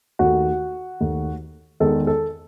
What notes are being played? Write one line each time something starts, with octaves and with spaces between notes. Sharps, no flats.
D#2 D#3 A3 F#4
D#2 D#3 A3
E2 D#3 G#3 A4
A4